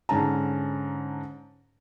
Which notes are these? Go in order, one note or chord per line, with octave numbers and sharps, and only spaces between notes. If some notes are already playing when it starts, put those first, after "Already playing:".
G#2 D3 C#4 A5 A#5